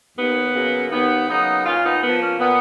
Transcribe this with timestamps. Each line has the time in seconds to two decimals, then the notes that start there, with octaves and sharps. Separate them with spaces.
0.17 D#2 B3
0.54 C#3 F#3 A#3
0.91 D#2 B3
1.28 C#3 F#3 A#3 B3 D#4
1.66 A#2 C#4 F4
1.83 B3 D#4
2.02 F3 A#3 B3
2.21 A#3 C#4
2.39 A#2 B3